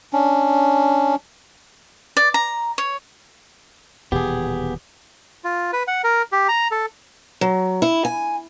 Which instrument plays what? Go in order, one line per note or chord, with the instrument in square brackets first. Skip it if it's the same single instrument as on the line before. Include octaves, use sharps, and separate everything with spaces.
[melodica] C#4 D4
[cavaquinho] D5
A#5
C#5
[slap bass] D#1 B2 E3 [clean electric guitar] B3 [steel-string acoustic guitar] G4 G#4
[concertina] F4
B4
F#5
A#4
G4
A#5
A4
[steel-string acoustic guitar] F#3
E4
G#5